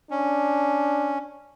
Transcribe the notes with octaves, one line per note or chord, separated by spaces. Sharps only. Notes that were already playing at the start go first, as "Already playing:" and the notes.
C#4 D4